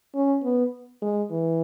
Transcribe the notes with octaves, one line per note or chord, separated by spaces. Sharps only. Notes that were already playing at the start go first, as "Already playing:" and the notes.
C#4
B3
G#3
E3